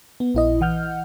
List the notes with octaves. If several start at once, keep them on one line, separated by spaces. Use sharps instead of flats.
B3
A#1 E4 D#5
E3 F#5 F6 G6